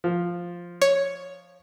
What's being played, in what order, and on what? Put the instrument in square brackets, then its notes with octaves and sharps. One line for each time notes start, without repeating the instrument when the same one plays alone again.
[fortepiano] F3
[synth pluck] C#5